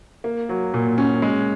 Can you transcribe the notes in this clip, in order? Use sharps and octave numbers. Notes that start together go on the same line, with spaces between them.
A#3
F#3
A#2
C#4
G#3